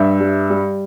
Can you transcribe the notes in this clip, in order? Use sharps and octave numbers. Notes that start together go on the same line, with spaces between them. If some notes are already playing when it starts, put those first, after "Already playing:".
Already playing: G2 E5
G3
G3